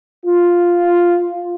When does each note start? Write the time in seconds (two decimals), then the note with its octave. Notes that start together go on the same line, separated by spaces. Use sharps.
0.25 F4